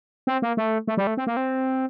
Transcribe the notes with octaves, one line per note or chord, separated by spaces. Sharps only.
C4
A#3
A3
A3
G3
A3
C4
A#3
C4